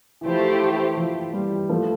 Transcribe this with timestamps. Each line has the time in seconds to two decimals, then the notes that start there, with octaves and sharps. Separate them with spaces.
0.21 E3
0.26 F3 A3 E4 G4 C5
0.61 E3
0.97 F3
1.33 E3 G3
1.69 F3 A3